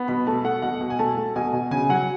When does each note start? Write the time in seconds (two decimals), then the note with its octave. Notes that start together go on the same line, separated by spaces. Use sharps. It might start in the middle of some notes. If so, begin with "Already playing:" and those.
Already playing: B3
0.08 B2 B5
0.27 A3 A5
0.44 A3 F#5
0.62 B2 F#5
0.81 B2
0.90 G#5
0.99 A3 A5
1.17 A3
1.36 B2 G#5
1.53 B2
1.71 C#3 G#5
1.89 F#3 F#5